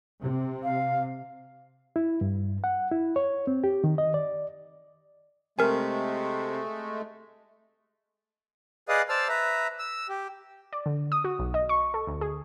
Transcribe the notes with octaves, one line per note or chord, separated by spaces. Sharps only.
C3
F5
E4
G2
F#5
E4
C#5
C4
G4
D#3
D#5
D5
C3 G#3 A3 A#4 G#5
G#4 B4 D5 D#5 F5 D#6
C5 D5 A5 E6 F6
B4 E5 A#5
E6
G4
D5
D3
D#6
F#4
B1
D#5
C#6
A4
D2
G#4